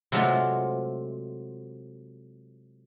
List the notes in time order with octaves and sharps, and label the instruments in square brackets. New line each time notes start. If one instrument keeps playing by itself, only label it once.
[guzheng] C3 F#3 G#3 A3 F4